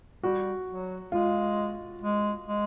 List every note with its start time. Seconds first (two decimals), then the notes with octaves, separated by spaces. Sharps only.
0.23 G3 F#4
0.68 F#3
1.12 G#3 F4
2.01 G#3
2.46 G#3